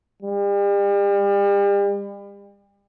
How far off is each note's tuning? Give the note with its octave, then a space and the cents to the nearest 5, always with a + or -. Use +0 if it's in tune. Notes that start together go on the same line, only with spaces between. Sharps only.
G3 +40